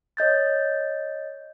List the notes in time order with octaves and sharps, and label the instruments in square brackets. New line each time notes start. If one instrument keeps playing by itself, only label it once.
[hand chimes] C#5 D#5 G6 A6